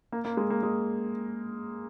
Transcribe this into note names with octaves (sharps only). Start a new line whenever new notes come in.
A#3
A#3
G#3
A#3
G#3